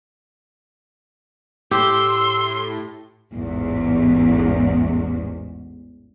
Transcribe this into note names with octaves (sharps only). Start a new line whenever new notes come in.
A2 G4 C6 E6
A1 E2 G#2